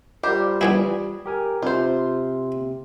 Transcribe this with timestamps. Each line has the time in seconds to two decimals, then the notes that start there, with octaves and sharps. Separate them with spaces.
0.23 G3 F4 G4 A#4 C5
0.61 G2 E3 E4 G#4
1.26 G4 A#4 G#5
1.62 C3 F4 C5